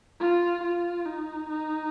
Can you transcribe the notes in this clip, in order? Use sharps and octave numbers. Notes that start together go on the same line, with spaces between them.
F4
F4
D#4
D#4